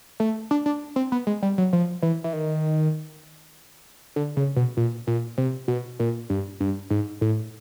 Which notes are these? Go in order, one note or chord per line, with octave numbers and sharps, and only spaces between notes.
A3
D4
D4
C4
B3
G#3
G3
F#3
F3
E3
E3
D#3
D3
C#3
B2
A#2
A#2
C3
B2
A#2
G2
G2
G#2
A2